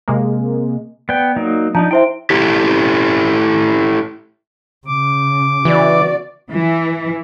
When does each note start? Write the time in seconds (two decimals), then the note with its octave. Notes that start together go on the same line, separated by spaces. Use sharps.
0.08 C3 G#3 A#3
1.09 B3 D5 G5
1.36 F#3 A#3 D#4
1.75 F3 D4 D#4 A5 A#5 G6
1.91 E4 C5 E5 G5 C6
2.30 A3 E4 G4
4.87 C#3 D6
5.65 E3 F#4 D5
6.50 E3